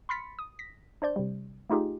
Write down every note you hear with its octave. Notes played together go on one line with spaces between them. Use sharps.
B5 C6 F6 A6 B6 C#7
D#6
A#6 B6
D4 C5 D5 G6
C3 G3
A3 D#4 F4 G4 G#4